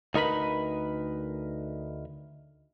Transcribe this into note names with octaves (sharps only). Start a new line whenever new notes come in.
D2 D#4 A#4 B4 B5